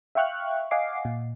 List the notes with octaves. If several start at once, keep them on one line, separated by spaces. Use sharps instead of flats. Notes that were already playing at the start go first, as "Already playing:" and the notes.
E5 F5 G5 C#6 F6 F#6
D#5 F5 F#5 G#5 D6 C7
A#2